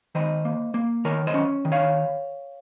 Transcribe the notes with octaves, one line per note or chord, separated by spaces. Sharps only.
D#3 C5 D#5
A#3
A#3
D#3 A#4 C#5
C5 D#5
C#4
D#3
C#5 F5